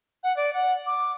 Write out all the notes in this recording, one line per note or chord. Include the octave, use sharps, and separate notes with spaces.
F#5
D5
F#5
D6